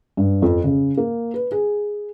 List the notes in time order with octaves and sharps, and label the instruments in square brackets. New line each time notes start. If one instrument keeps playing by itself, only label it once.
[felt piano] G2
F2
C#3
A#3
B4
G#4